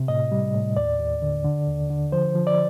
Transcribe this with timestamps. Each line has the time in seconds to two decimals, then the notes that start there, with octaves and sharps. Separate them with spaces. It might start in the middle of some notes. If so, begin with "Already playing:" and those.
Already playing: C3
0.08 A2 D#5
0.32 G3
0.54 A2
0.77 D#2 D5
1.00 D#2
1.22 D3
1.45 D3
1.67 D#2
1.90 D3
2.12 F3 C5
2.35 F3
2.47 D5